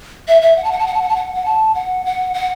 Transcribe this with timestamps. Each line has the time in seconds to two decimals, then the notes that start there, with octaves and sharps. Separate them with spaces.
0.28 E5
0.42 E5
0.57 F#5
0.64 A5
0.71 F#5
0.79 A5
0.87 F#5
0.94 A5
1.02 F#5
1.09 A5
1.16 F#5
1.35 F#5
1.45 A5
1.75 F#5
2.05 F#5
2.34 F#5